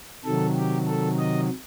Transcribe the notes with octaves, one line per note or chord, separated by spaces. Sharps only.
C3 D#3 F#3 A4
G4
A4
D#5